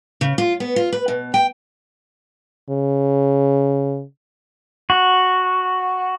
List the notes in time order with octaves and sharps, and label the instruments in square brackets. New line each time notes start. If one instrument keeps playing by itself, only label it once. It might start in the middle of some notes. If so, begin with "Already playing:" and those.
[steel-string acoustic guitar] C#3
F4
B3
F4
B4
B2
G5
[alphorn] C#3
[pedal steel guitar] F#4